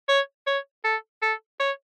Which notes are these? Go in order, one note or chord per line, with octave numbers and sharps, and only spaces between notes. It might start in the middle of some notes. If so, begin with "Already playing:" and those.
C#5
C#5
A4
A4
C#5